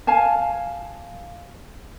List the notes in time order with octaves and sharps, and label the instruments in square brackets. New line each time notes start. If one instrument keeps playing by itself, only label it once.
[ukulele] F5 G#5 A5